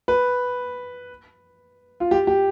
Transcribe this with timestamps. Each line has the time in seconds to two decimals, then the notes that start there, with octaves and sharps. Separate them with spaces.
0.08 B4
2.00 F4
2.11 G4
2.27 G4